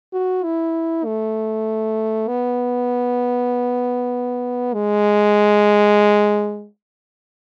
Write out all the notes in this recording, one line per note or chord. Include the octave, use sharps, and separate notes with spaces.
F#4
E4
A3
B3
G#3